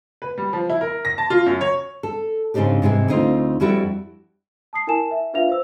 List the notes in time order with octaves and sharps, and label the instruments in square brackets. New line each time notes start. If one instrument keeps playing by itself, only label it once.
[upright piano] B4
G3
F3
E4
A#4
A#6
A5
F4
F#2
C#5
[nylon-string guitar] A4
G#2 C#3 C4 D4 D#4 G4
G#2 C3 E3 G#3
D2 C4 D#4 F4
F2 G3 E4 F#4 G5
[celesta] A5 D#6 C7
E4 A#4 G#5 A5 E7
E5
D4 F4 B4 E5 F5 F7
C5 E6